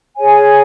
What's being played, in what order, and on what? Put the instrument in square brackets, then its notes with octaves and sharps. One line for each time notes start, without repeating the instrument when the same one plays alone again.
[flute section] G#4 C#5 G#5